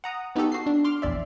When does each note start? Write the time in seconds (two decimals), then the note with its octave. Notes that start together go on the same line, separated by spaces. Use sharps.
0.04 F#5 A#5 D#6
0.36 B3 D#4 F#4 G4 A4
0.52 F#4 C7
0.66 D4
0.84 C6 D6 F6
1.02 A#1 E2 D5 E5